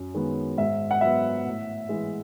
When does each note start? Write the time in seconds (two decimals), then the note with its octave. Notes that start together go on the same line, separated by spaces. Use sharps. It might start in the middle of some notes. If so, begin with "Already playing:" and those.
Already playing: F#2
0.14 D#3 G#3 B3
0.57 G#2 E5
0.91 F#5
1.01 F#3 B3 E5
1.45 A2
1.89 E3 G#3